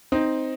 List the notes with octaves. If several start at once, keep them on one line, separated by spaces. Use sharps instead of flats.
C4 D#4